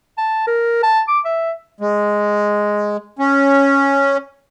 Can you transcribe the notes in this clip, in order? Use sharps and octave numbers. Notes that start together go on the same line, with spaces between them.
A5
A#4
A5
D6
E5
G#3
C#4